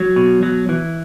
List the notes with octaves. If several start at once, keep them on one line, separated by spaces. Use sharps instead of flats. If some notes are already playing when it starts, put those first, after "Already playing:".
Already playing: F#3
B2
F#3
E3